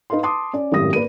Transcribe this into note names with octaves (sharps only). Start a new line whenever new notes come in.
D#4 B4 D#5 F5 C6
A5 C6 D6 D#6
C#4 D5
G#1 F#2 A2 G4 D#6 A#6
A#3 B4 D5 D#7